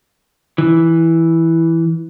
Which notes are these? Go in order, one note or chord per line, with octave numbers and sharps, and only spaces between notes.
E3